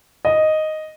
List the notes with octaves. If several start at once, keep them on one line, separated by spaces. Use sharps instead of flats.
D#5